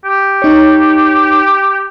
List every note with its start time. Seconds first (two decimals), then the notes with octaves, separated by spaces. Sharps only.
0.04 G4
0.42 D#4 C#5